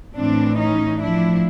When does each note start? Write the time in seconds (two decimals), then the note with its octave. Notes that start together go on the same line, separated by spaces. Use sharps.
0.15 A2 E3 C4 D4
0.57 C#4 D#4
1.00 A2 F3 D4 E4